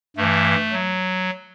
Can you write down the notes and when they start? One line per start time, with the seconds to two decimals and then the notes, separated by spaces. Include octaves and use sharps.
0.17 G2 E3 A3
0.72 F#3